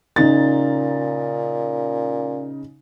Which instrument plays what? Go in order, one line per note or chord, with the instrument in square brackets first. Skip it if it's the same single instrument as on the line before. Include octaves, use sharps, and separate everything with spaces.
[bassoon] A#2 [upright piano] C#3 D#4 A6